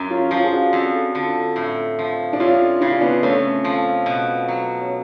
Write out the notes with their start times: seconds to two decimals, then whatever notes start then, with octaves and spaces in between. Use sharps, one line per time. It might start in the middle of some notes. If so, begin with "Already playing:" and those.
Already playing: F#2
0.10 C#4 F4
0.31 F3 C#4 F4
0.44 G#4
0.52 D4 F#4
0.73 F2
1.15 D3
1.56 A2
1.99 F3
2.33 D4
2.40 F2 C#4 F4
2.81 C#3 D4
2.92 F4
3.01 B3 D4
3.23 F2 A3 C#4
3.64 F3
4.06 B2
4.48 F#3
4.80 C#4